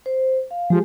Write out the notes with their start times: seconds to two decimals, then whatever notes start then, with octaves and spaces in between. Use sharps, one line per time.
0.06 C5
0.51 F5
0.70 F3 G#3 G4 G#4